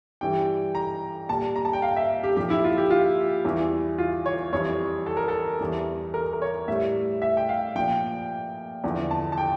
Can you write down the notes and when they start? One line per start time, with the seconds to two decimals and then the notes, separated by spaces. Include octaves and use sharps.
0.21 G2 E3 G3 G5
0.75 A#5
1.29 A#2 G3 A5
1.56 A#5
1.65 A5
1.73 G5
1.82 F5
1.97 E5
2.23 G4
2.37 A#2 F3 G4
2.50 E4
2.64 F4
2.78 G4
2.90 F4
3.45 E2 E3 G3
3.98 F4
4.26 C#5
4.53 F2 E3 G3 C#5
5.06 A4
5.17 A#4
5.28 A4
5.61 E2 E3 G3
6.14 A#4
6.33 A#4
6.42 C#5
6.68 A2 G3 E5
7.22 E5
7.37 G5
7.49 F5
7.76 A#2 F3 G5
8.84 E2 D3 F3
9.11 A5
9.32 A5
9.38 G5